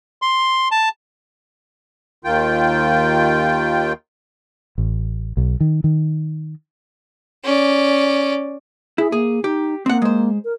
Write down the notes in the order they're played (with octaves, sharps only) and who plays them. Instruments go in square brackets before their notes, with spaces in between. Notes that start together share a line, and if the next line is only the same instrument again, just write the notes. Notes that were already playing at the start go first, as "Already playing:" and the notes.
[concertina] C6
A5
[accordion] D#2 D#3 F4 G5
[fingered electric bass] A1
B1
D#3
D#3
[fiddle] C#4 D5
[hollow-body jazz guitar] E4 [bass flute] G#4
[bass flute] A#3 [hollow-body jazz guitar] G#4
[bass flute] D#4 [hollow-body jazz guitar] G4
[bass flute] A#3 [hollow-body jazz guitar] C4 F#5
[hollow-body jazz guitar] G#3 C5
[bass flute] A#4